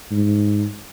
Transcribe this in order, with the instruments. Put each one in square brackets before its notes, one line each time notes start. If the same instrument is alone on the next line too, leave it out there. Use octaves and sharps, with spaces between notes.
[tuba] G#2